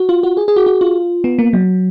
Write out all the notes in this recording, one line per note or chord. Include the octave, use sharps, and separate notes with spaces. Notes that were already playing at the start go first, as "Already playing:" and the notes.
Already playing: F#4
F4
F#4
G#4
G#4
F#4
F#4
F4
B3
A#3
F#3